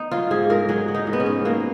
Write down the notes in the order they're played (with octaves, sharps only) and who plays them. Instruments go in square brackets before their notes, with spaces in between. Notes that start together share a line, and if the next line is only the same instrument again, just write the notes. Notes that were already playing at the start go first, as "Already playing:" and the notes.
Already playing: [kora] B3 D#4
F#3 F4
G#2 G#4
G#2 A#4
F#3 G#4
F#3
D#4
G#2
B3
C#4
G#2
F#3 A#3